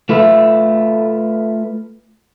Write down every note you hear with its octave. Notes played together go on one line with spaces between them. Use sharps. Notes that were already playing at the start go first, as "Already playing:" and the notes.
A3 F4 B4 E5